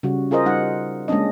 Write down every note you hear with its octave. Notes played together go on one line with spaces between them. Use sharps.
C#3 G3 F#4
F4 G#4 A#4 C5 D#5
G3 D#4 F#5
G#3 A#3 C#4 D4 D#5